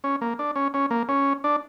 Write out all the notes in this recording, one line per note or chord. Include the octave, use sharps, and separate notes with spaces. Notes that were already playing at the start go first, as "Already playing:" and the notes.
C#4
A#3
D4
C#4
C#4
A#3
C#4
D4